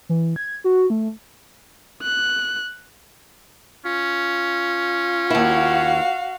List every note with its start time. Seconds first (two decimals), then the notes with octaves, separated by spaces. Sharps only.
0.09 E3
0.36 G#6
0.64 F#4
0.90 A3
2.03 F#6
3.85 C#4 F4
5.30 D#2 E4 F#4 F5